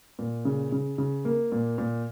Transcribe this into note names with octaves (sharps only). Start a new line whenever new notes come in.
A#2
C#3
C#3
C#3
A#3
A#2
A#2